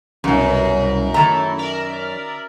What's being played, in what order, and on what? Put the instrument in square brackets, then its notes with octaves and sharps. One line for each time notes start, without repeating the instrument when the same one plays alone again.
[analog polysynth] C2 B2 [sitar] F#2
[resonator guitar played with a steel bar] D#3 A#5 [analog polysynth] A3 E4 A4
[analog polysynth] A#4 D5 E5